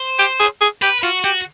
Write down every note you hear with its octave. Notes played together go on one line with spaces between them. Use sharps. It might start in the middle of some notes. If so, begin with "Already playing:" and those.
Already playing: C5
G4
G#4
G#4
G4 B4
F4 F#4
F#4 G4